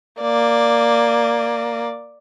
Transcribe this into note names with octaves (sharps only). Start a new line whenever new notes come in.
A#3 D5